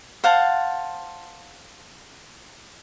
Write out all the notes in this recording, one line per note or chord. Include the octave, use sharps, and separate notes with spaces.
C5 F5 F#5 A5